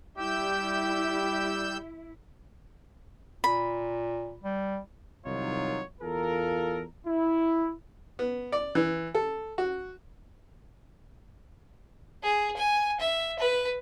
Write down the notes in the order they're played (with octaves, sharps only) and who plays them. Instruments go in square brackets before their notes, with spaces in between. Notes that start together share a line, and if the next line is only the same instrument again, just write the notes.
[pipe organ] G3 E6 G6 [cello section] E4 [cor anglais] G4
[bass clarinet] A#2 [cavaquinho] B5
[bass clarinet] G3
[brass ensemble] C2 D#3 F#3 D#4 F4 C#5
E2 F4 A4 A#4
E4
[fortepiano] B3
D5
E3
A4
F#4
[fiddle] G#4
G#5
E5
B4